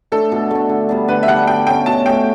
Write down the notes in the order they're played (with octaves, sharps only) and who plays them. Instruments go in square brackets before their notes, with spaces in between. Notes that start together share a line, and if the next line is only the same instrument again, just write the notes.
[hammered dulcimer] A3 D4 [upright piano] A4
[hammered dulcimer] B2
A3 D4
D3
G3 B3 D4
[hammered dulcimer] D3 [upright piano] B4
[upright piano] E5
[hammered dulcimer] G3 B3 D4 [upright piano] F#5
[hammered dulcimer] B2 [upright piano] G5
[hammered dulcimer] A3 C#4 F#4 [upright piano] G5
[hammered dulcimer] B2 [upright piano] A5
[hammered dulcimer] A3 C#4 F#4 [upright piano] G5